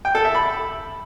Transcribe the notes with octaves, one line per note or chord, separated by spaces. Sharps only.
G5
A4
E5
B5